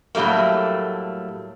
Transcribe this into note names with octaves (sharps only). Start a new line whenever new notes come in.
A2 F#3 G3 A3 A#3